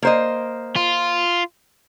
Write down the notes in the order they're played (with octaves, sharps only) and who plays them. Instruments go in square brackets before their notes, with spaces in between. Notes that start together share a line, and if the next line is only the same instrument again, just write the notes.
[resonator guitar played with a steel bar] A#3 C5 D#5
[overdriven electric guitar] F4